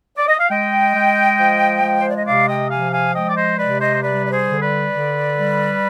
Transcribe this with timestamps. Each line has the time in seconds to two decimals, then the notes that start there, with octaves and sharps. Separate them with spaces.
0.17 D5
0.28 D#5
0.39 F5
0.50 G#3 D#5 G5
0.95 G#3
1.38 F3
1.83 G#3
2.00 C5
2.09 D5
2.18 D#5
2.26 C3 D5 F5
2.48 D#5 G5
2.70 F3 F5 G#5
2.92 F5 G#5
3.15 G#3 D#5 G5
3.29 D5
3.36 C5 D#5
3.58 C3 B4 D5
3.80 C5 D#5
3.94 C5
4.02 G3 B4 D5
4.27 D5
4.32 G#4 C5
4.47 D3
4.62 B4 D5
4.92 D3
5.35 G3